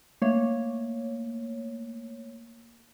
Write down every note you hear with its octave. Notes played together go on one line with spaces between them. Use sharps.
A3 A#3 C#5